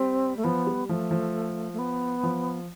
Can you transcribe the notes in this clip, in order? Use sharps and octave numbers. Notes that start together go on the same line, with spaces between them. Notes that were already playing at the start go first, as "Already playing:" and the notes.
Already playing: G3 C4
A3
F3 B3
G3
F3 A3
F3
A3
B3
F3